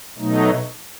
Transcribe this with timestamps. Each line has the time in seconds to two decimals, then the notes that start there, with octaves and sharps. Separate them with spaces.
0.18 B2 F#3 A3 D#4